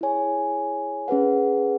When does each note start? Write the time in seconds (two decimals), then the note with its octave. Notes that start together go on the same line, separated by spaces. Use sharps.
0.01 E4 G#4 C#5 G#5
1.08 C#4 G#4 B4 F#5